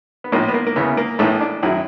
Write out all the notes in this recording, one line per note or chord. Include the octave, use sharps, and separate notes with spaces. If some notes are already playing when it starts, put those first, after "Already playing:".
B3
A#1 A2 F3 A#3
B3
A#3
A#3
E2 C#3 E3 B3
A#3
A#1 A2 E3 A3
D4
F#2 D#3 F#3 E4